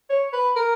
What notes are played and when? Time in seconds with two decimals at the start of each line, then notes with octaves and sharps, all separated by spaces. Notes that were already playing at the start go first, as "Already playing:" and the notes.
0.10 C#5
0.33 B4
0.56 A#4